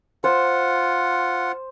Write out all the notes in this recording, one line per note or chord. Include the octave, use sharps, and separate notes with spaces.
F4 C5 F#5